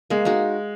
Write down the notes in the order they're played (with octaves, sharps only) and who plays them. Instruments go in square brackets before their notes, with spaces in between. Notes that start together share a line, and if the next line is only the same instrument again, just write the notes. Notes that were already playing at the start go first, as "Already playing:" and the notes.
[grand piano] G#3 [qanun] A#3
[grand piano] G#3 [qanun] D#4 F#4